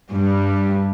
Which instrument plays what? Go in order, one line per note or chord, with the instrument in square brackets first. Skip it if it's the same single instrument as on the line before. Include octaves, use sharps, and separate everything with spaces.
[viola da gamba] G2 G3